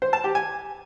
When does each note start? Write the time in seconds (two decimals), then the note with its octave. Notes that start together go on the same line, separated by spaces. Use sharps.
0.02 C5
0.13 A5
0.24 G4
0.35 G#5